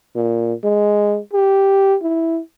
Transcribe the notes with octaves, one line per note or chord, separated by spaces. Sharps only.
A#2
G#3
G4
E4